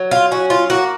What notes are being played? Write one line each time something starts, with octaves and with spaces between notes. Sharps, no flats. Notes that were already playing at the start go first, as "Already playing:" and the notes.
Already playing: F#3
F4
C#4 F#4
F4
A#3 F#4